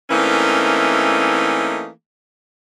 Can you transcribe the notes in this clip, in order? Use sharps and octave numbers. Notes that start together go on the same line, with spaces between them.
E3 A3 A#3 C4 C#4 D#4